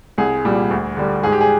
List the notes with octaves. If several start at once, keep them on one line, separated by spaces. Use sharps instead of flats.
C2 G#4
A#2 G3
D2
D3 G3
G#2 G#4
G4
G#4